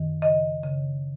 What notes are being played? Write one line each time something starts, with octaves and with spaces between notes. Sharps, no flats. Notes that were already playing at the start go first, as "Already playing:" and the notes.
Already playing: F#2 D#3
C#3 D#5
C#3